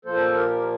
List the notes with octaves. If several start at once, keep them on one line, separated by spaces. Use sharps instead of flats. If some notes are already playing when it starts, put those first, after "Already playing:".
A#2 F3 A#3 A4 C5
G4 A#4